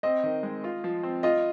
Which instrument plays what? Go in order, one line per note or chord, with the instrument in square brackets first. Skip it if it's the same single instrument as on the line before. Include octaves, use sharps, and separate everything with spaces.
[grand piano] C4 [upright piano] D#5
[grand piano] D#3
G#3
F4
F3
C4
[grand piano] F4 [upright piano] D#5